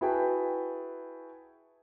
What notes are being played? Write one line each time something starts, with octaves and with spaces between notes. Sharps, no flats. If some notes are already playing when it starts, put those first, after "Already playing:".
E4 F#4 G#4 B4 G5 A5